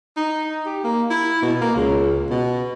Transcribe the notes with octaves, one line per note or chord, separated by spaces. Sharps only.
D#4
G4
A#3
E4
B2
A#3
C#2
B2